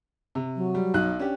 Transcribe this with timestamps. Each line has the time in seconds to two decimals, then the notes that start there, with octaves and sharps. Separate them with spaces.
0.35 C3
0.56 F#3
0.75 G3
0.94 B1 D#4 F#6
1.19 C#4 D4 G4